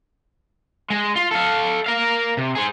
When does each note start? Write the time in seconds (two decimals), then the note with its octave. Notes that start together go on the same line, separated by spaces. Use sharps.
0.90 G#3
1.16 F4
1.31 A4 F5
1.86 A#4 F5
2.37 C3
2.55 G#4 C5